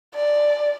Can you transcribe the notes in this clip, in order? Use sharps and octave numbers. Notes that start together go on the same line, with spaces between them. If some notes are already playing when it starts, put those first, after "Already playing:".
D5